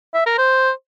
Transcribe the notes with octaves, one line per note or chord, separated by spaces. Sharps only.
E5
A#4
C5